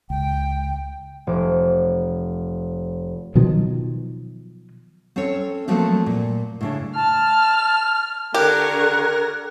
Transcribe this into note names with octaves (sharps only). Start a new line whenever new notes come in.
C#2 G5
F1 D6
B2 D#3 F3 F#3
C4 C#4 A4 C#5
F3 F#3 A3 A#3 C4
A#2
A2 C#3 D4
A5 F6
D3 G4 A#4 A#5 C#6 F#6 G#6